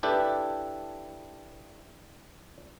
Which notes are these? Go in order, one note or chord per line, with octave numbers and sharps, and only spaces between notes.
D4 E4 G4 A4 B4